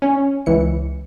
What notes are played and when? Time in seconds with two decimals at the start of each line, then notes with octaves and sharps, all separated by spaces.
0.02 C#4
0.46 C#2 E3 C#7